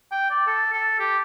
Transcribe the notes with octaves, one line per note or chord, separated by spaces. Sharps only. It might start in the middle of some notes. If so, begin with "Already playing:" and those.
G5
D5
A4
A4
G4